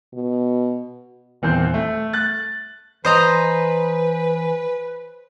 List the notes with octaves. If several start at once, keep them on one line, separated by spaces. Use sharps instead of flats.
B2
D#1 E2 C4 C5
A3
F#6 A6
E3 B4 C5 D#5 G#5 A#5